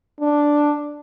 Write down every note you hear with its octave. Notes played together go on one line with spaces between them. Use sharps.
D4